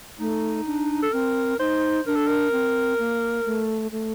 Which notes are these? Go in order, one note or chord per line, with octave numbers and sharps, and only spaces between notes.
A3 D#4
D4
A4
C4 A#4
D#4 C5
D4 A#4
A4
A#4
C4
A#3
A3
A3